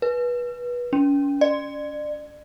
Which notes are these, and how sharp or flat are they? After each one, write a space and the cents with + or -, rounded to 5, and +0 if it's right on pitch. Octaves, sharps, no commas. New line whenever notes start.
B4 -20
C#4 +35
D5 +35